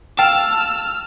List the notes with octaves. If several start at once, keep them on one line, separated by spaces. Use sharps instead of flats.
F5 G5 A5 E6 F6